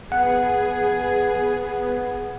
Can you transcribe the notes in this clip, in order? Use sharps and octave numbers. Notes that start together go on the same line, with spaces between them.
B3 G#4 F#5